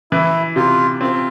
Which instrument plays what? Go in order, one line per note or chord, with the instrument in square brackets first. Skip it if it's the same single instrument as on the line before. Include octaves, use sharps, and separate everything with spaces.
[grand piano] E3 [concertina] E4
[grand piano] C3 [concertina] F4
[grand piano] C4 [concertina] F4